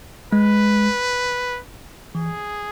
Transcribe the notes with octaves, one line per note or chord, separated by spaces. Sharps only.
G#3 B4
E3 G#4